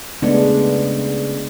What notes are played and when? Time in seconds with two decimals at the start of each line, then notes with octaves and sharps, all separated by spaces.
0.22 C#3 G#3 A3 B3 D4